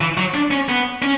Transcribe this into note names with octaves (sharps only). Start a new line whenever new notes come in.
E3
F#3
D4
C#4
B3
C#4